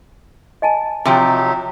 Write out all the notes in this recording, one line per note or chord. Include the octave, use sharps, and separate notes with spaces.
D#5 G#5 A5
C3 F3 F#3 D#4 G4 E5